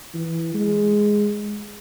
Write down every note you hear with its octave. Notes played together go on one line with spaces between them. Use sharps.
E3
G#3